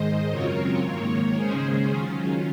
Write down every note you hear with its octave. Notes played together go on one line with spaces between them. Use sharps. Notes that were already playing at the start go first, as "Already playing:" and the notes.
Already playing: G#2 D#3 G#3 C5 D#5
F#2 C#3 F#3 C4 F4 A#4 C#5
G#2 D#3 A#3 A#4 C#5
C#3 G#3 C#4 G#4 C5
D#3 F#3 C#4 F4